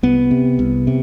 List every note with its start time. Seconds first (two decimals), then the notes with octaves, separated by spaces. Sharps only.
0.03 C2 B3
0.31 C3
0.59 C2
0.87 C3